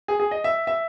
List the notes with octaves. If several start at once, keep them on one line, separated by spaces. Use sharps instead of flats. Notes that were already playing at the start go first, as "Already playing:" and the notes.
G#4
G#4
D#5
E5
E5